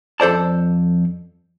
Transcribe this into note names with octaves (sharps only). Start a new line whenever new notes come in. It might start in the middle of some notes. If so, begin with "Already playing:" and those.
F2 A4 C5 D5 A5